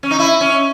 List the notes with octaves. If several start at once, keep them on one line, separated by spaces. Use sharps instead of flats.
C#4
D#4
E4
C#4